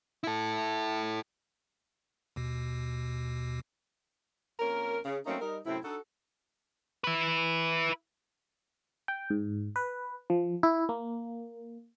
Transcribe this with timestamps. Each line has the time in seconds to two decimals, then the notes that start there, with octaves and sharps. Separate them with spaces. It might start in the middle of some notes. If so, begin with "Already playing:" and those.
0.24 E4 A4
2.36 D#2 B2
4.60 F2 A#3 C#4 A#4
5.05 C#3
5.27 F#3 A3 A#3 C4 C#4 D#4
5.41 G3 D#4 A#4
5.66 F#2 A2 C3 C4 E4
5.84 D4 D#4 F#4 A4
7.04 E4 B4
9.08 G5
9.30 G#2
9.76 B4
10.30 F3
10.63 E4
10.89 A#3